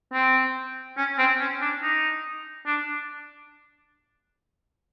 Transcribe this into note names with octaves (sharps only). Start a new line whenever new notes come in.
C4
C#4
C4
C#4
D4
D#4
D4